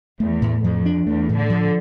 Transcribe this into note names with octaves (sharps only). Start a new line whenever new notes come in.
E2 A3
A2
F2 F3
D4
E2 A3
A2
D3
F3